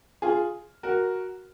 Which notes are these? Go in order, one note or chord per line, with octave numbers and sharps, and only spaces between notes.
F4 G#4
F#4 A#4